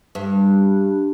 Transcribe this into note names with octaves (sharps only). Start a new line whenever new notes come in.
G2